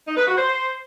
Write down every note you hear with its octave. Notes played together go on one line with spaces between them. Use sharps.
D#4
B4
F#4
C5